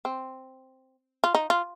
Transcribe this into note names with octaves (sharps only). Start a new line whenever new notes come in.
C4
F4
D#4
F4